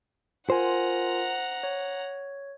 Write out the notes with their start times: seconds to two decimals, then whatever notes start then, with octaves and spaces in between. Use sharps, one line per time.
0.50 F4 A#4 C5 F#5 G#5 A#5
1.63 C#5